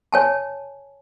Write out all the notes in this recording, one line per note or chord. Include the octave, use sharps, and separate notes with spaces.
C#5 G#5 A5